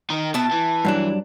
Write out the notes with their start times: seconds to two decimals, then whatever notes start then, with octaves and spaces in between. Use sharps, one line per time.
0.10 D#3 D#4
0.34 B2 E4 A5
0.51 E3
0.85 G2 F#3 D4